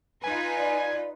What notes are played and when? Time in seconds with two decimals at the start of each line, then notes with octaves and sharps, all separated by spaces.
0.24 D#4 F4 B4 G#5
0.57 D5